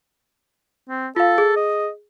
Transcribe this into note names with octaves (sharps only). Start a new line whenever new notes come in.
C4
F4 A4 F5
G#4
D#5